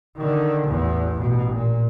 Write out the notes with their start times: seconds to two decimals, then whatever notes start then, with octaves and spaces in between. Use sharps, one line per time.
0.17 D3 D#3
0.67 A1 E2
1.17 A1 B2
1.53 A#2